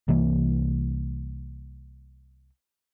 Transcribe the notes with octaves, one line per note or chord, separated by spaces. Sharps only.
C2 E3 A#3